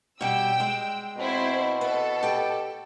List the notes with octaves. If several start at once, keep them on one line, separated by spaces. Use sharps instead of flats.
B2 G3 G5 E6
G#3
B2 C4 E4 C5
A4 B4
G4 G5